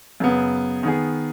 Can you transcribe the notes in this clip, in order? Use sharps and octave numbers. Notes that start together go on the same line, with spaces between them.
F#2 C#3 B3
D#3 B3 G#4